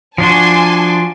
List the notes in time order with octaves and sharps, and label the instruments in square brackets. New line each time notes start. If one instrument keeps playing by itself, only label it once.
[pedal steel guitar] F3 D4 F#4 [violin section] G#5 A5 C6